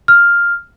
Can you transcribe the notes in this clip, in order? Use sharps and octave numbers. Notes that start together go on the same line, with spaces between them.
F6